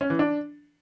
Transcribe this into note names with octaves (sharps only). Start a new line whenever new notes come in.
C#4
E3
D4